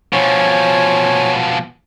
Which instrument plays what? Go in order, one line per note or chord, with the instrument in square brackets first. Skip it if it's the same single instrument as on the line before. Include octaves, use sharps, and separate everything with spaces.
[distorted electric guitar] B2 F3 [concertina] C#5 G#5